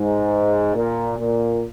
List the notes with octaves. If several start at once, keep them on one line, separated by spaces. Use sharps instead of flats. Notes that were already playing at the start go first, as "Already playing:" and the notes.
Already playing: G#2
A#2
A#2